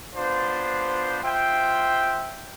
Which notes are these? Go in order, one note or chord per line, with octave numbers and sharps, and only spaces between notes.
B3 D4 F4 C5
F4 C5 E5 G5